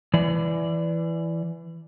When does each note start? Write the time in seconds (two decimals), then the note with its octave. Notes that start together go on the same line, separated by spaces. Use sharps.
0.14 E3 D5